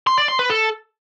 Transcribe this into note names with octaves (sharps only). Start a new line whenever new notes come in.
C6
D5
C6
B4
A4